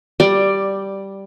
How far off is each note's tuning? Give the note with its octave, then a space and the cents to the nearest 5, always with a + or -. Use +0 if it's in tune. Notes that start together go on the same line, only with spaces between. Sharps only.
G3 -5 D5 +10 G5 +0